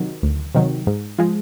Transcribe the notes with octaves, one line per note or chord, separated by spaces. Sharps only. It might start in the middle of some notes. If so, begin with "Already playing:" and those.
Already playing: C3 D#3 F#3
D2
C3 D#3 F#3
G#2
F3 G#3